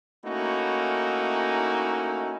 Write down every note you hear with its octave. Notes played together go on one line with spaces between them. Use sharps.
A3 A#3 C#4 D#4 E4 F#4